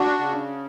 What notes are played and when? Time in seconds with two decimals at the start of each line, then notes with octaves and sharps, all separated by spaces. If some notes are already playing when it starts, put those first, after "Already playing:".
Already playing: D4 F#4
0.18 C#3